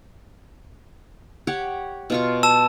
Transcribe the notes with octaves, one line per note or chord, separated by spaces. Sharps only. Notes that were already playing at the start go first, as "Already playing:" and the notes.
G4 C#5 F#5
B2 F4 C#6
A5 E6 E7